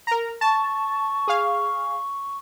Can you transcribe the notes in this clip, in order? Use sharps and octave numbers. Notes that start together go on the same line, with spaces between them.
A#4 A#5
A5 C#6
G#4 F5